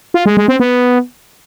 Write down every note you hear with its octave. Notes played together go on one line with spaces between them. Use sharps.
F4
G#3
G#3
C4
B3